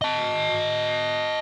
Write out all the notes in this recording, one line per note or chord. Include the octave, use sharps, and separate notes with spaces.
D#5 A5